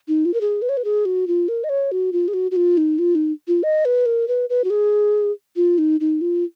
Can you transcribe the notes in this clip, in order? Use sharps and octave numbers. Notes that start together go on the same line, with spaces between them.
D#4
F4
A#4
G#4
B4
C#5
B4
G#4
F#4
F4
A#4
D#5
C#5
F#4
F4
G#4
F#4
F#4
F4
D#4
F4
D#4
F4
D#5
B4
A#4
B4
B4
F#4
G#4
F4
D#4
D#4
F4